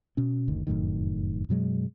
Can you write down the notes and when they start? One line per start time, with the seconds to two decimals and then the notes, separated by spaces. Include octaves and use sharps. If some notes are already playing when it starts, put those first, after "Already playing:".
0.17 B2 C#4
0.48 F#1 D2 D#3
0.67 F1 F#2 A2 D#3
1.49 F#2 B2 F#3 G#3